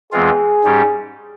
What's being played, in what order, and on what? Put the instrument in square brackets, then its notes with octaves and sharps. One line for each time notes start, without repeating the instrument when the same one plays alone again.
[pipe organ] E2 E3 G#3 C4 F4 [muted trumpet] G#4
[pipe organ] G#2 G3 C#4 G4